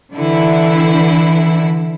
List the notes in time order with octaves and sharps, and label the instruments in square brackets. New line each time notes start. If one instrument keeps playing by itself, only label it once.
[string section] D3 E3 E4